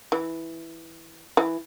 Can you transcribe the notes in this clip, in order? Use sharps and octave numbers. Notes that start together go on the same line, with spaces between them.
E3
E3